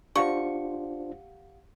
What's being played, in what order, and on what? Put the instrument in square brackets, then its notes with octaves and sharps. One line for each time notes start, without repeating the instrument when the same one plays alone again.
[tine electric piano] D4 F4 C5 [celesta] G4 F5 F#5 [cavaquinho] C#6